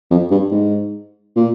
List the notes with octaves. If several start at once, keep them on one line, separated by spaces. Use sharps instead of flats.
F2
G2
G#2
A#2